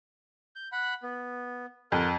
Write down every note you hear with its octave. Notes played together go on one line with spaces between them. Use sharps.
G6
F#5 B5 F#6
B3
F2 A#4 F#5 C6